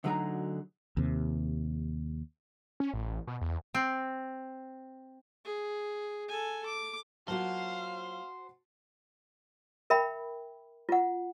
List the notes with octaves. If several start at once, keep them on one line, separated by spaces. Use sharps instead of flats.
D2 D3 F#3 D#4 G#4 A#5
D#2 C3
C#4
A1
B2
E2
C4
G#4
A4 G#5
D6
F#3 A#3 F4 F#4 C5 F5 F#5 A5
A#4 E5 G5 B5
F4 F#5